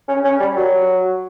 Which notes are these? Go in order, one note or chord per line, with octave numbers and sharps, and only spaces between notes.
C#4
C#4
G3
F#3